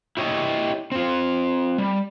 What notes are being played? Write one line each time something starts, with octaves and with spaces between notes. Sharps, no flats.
E4 G4 C#5 D#5
C4 F4
G3